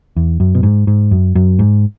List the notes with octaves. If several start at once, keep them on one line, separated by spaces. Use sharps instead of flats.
E2
F#2
B2
G#2
G#2
F#2
F#2
G#2